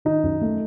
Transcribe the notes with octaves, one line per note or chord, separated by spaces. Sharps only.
D#3 D#4
F#2
A3